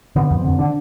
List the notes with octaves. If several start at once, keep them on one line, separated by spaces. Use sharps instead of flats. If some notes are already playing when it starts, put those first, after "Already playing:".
D3 B3
F2
C4
D3
D3 D4